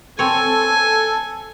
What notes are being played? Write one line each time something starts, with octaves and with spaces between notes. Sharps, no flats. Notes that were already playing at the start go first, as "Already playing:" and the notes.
C4 A4 C#5 G#5